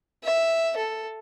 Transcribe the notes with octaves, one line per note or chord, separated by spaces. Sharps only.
E5
A4